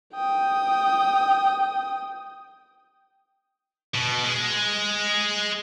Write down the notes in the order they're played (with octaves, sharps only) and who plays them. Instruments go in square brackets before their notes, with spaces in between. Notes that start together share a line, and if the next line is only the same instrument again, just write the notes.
[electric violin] G5 D#6
[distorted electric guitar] B2
G#3